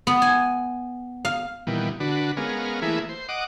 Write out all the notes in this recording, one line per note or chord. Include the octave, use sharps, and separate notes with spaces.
B3
G#5
F5
A#2 D#3 E3 G3 B3
D3 D4 F#4 B4
G#3 B3 C#4 A#4 F5
E3 A3 A#3 E4 G#4 B4
C5
D#5 F#5 D6